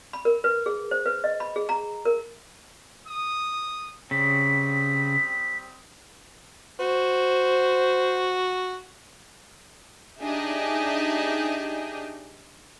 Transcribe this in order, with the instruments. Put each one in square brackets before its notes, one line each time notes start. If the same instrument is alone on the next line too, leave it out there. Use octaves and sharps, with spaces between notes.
[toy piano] B5
A#4
B4
G#4
C5
B4
D#5
B5
G#4
A#5
A#4
[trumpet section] D#6
[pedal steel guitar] C#3 [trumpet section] G3 C4 D#6 [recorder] B6
[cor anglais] F#4 [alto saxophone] C5
[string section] D4 D#4 G4 G#4 D#5 E5